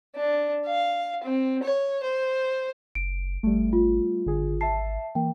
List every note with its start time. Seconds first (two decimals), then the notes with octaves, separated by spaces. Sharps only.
0.16 D4
0.66 F5
1.23 C4
1.63 C#5
2.03 C5
2.95 F#1 D7
3.43 G#1 G3 A3
3.73 F4
4.26 G#1 D3 G#4
4.61 E5 A5 C7
5.15 E3 A#3 G5